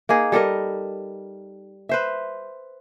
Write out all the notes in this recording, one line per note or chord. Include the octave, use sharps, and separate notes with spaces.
A#3 D#4 G#4
G3 A4 A#4 D#5
B4 C5 E5